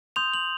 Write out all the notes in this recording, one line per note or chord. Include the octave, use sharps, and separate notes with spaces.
C6 D#6 G6 F7
F#7